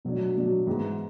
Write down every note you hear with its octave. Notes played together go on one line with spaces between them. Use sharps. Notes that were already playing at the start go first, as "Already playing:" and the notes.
B2 F#3 A3 D4
B2 F#3 A3 D4
G#2 E3 G#3 B3